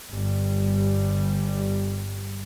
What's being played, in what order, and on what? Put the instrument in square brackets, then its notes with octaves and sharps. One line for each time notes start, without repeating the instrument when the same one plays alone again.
[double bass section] G1 G3